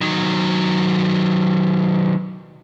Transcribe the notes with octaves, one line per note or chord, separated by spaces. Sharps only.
D#3 F#3